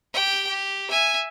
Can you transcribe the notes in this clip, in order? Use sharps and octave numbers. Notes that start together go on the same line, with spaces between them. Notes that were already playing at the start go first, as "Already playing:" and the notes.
G4 G5
G4
E5 G#5